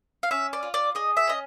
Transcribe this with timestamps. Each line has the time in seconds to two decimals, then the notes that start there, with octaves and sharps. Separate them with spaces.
0.23 F5
0.31 C#4 E5
0.53 D5
0.63 F4
0.74 D5
0.95 G#4 D#5
1.17 E5
1.27 C#4 D#5